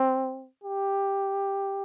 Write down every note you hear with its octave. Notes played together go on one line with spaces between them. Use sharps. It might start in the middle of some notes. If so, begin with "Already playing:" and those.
Already playing: C4
G4